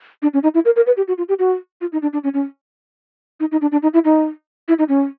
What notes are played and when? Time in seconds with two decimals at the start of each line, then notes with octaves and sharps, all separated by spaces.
0.22 D4
0.34 C#4
0.43 D#4
0.54 E4
0.65 A#4
0.76 A#4
0.87 B4
0.97 G4
1.08 F#4
1.18 F4
1.29 G4
1.39 F#4
1.81 F4
1.92 D#4
2.02 D4
2.13 D4
2.24 C#4
2.34 C#4
3.40 D#4
3.52 D#4
3.61 D4
3.72 D4
3.83 D#4
3.94 E4
4.05 D#4
4.68 E4
4.79 D#4
4.89 C#4